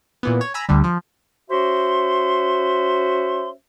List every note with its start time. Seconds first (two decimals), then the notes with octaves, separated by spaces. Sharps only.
0.23 A#2 E3 B3
0.41 C#5
0.54 G#5 A#5 B5 E6
0.69 D2 D3 G3
0.84 F3
1.50 C#4 F#4 C5 E5 C6